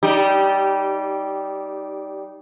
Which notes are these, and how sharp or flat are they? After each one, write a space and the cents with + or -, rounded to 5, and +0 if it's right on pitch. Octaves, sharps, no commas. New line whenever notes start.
G3 -20 D#4 +0 G4 +0